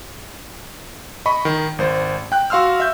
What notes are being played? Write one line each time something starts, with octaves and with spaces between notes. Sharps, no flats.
D#5 B5 C#6
D#3
G#1 C5
G5 F#6
F#4 F5 C6 E6 F6
E5 G6